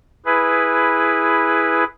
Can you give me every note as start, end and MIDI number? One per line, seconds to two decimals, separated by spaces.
0.25 1.84 64
0.25 1.84 68
0.25 1.84 71